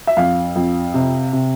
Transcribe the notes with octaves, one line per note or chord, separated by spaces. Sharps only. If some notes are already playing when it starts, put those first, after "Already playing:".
E5
F2 F5
F2
C3
C3